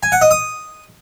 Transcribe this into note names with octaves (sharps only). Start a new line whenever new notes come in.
G#5
F#5
D#5
D#6